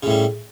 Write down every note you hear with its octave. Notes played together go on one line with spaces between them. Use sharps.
A2 C#3 G3